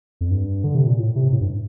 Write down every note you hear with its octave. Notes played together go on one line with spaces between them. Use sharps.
F2
G2
D3
C3
A#2
A2
C3
A2
G2